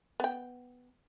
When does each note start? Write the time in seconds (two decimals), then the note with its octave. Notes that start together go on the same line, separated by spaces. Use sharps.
0.20 B3 G5